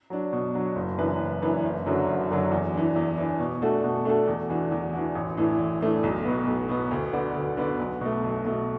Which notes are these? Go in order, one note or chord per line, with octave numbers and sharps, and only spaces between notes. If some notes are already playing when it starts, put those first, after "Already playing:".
F#3 D4
B2
F#3 D4
F#1
F#2 E3 D4 B4
F#1
F#2 E3 D4 B4
F#1
F#2 D3 F#3 D4
F#1
F#2 D3 F#3 D4
E2
E3 D4
E2
E3 D4
B2
A3 D4 F#4 A4
B2
A3 D4 F#4 A4
E2
E3 D4 F#4
E2
E3 D4 F#4
A1
A2 E3 A3 D4
A1
A2 E3 A3 D4
B1
B2 B3
B1
B2 B3
D2
D3 B3 F#4 D5
D2
D3 B3 F#4 D5
B1
B2 A3
B1
B2 A3